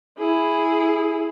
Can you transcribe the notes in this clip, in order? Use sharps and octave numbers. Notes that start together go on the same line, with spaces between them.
E4 G#4